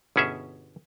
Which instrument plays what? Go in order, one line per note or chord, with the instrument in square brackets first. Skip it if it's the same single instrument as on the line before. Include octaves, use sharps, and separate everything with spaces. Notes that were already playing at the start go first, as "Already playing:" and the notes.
[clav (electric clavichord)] G1 B2 C#4 G#4 E5